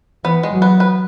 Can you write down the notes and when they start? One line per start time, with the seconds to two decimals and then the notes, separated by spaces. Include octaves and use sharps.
0.24 E3 B3
0.43 G#3
0.52 F#3
0.62 B3
0.80 B4